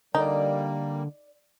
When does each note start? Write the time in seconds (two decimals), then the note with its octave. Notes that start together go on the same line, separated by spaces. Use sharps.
0.15 D3 G3 A#3 D#4 D5